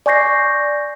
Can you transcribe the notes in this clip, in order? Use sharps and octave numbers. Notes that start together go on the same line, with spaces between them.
D5 G#5 C#6 G6 A#6 C7